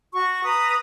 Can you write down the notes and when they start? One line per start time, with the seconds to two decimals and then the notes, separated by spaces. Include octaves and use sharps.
0.13 F#4 C#6
0.44 B4 A#5 D#6